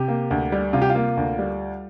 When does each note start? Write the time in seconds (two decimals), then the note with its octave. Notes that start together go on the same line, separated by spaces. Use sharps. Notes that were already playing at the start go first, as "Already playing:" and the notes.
Already playing: C3 G4
0.08 A#3
0.31 D2
0.52 G3
0.73 C3 F4
0.82 G4
0.90 F4
0.95 A#3
1.17 D2
1.39 G3